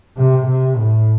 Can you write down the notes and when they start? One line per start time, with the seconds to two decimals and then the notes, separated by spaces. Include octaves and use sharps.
0.17 C3
0.46 C3
0.76 A2